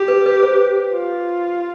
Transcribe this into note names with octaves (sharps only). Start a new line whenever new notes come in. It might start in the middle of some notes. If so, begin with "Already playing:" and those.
Already playing: G4
B4
B4
C5
F4